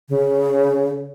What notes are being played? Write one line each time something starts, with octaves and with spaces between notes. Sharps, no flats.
C#3